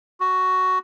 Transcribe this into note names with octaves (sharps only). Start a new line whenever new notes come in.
F#4